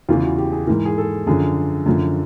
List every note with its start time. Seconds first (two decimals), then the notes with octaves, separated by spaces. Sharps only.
0.09 E2 C#3 E3 F4
0.23 F#4
0.38 G4
0.52 G#4
0.67 G#2 E3 A#4
0.85 G#4
0.98 A4
1.27 F#2 D3 F3 G#4
1.86 F#2 D3 F3